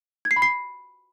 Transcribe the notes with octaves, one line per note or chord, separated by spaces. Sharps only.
G#6
C7
B5
C7